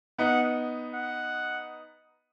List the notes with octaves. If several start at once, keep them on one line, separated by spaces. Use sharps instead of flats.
B3 D#4 F#5
F#5